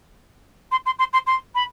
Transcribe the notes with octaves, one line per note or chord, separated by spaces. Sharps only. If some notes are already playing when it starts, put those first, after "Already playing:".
C6
C6
C6
C6
C6
B5